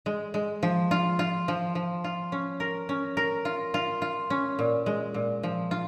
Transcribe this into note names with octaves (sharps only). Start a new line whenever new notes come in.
G#3
G#3
F3
F4
F4
F3
F3
F4
C#4
A#4
C#4
A#4
F4
F4
F4
C#4
A#2
G#3
A#2
F3
F4